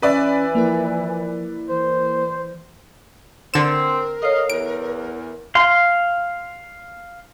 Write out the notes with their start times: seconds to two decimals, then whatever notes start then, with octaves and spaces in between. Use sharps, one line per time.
0.02 E3 C#4 B4 D5 E5
0.55 F3 A#3 E4 A#4
1.70 E3 C5
3.54 D3 C4 A#4 E7
4.22 A4 C#5 D#5 F5
4.50 E2 D7
5.55 F5 C6